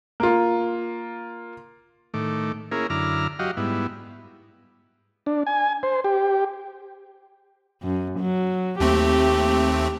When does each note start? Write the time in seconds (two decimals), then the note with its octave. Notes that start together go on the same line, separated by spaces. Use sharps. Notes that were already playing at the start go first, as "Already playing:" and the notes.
0.20 A#3 F4
2.14 A2 D#3 A3 D6
2.72 A#3 C#4 E4 G#4 A#4
2.90 F#2 D3 E4 A#5 D6 F6
3.39 F#3 F#4 G4 D#5 F5
3.57 G#2 G3 B3 E4
5.26 D4
5.47 G#5
5.83 C5
6.04 G4
7.82 F#2
8.19 F#3
8.80 D#2 A3 C4 G4